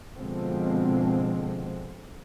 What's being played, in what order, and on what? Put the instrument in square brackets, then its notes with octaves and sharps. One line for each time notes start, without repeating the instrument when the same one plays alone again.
[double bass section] B2 D3 F3 G#3 C4